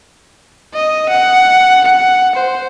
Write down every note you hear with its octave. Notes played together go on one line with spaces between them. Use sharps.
D#5
F#5
F#5
C5